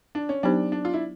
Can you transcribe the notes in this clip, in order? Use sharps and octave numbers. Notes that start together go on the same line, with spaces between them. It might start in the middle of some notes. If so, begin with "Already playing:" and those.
D4
C#4
F#3 B3 D4 D#4 G4 C5
D4
F4
E4